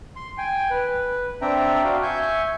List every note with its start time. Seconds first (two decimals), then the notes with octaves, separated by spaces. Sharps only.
0.16 C6
0.38 G5 G#5
0.71 B4
1.42 C4 D4 E5 G5 A#5
1.84 F#4 F5
2.03 E5 G#5 C#6 G6